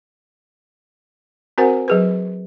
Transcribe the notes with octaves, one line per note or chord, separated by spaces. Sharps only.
C4 F#4 A#4 C5 F#5 G#5
F#3 G#4 B4